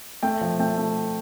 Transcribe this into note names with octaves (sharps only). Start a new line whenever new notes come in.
A3 G5
F3
A3 G5
A3